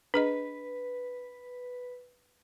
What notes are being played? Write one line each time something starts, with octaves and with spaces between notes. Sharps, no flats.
D4 G#4 B4 D#5